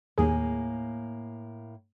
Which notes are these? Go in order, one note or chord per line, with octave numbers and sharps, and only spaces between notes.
D#2 A2 A#3 G#4 G#5